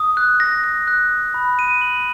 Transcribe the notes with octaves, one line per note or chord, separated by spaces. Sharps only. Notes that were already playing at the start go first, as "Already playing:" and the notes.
Already playing: D#6
F#6
A#6
A#6
F#6
D#6
B5
D#7
F#7